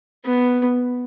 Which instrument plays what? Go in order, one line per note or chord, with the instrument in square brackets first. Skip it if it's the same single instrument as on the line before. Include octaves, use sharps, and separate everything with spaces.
[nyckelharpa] B3